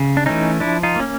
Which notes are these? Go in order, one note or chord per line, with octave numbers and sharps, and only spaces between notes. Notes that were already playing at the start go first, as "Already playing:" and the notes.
Already playing: C#3
D4
E3 A3 C#4 D#4
F3 D4 E4
D#4 F4
A#3 C#4